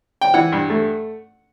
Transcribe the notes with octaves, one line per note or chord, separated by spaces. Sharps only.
G5
E3 F#5
G2
A3